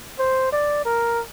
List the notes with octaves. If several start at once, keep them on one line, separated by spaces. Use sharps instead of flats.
C5
D5
A#4